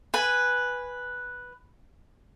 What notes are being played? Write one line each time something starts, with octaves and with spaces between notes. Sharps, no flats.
B4 G#5